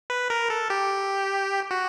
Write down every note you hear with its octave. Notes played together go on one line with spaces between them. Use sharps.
B4
A#4
A4
G4
F#4